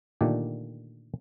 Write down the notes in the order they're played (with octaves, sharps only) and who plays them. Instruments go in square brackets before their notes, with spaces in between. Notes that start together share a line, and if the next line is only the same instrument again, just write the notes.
[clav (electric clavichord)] A#2 D3 D#3 A3 D4 G4